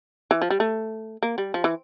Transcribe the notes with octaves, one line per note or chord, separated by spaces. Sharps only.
E3
F3
G3
A3
A#3
G3
F3
E3